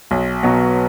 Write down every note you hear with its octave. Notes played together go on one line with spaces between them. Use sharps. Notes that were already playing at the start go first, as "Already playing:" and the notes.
B1
B2 F#3 B3